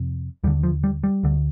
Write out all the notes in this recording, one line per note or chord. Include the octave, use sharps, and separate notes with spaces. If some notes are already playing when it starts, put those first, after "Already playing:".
Already playing: F2 C3
D#2 D3 G3
F3
G3
G3
D2 D3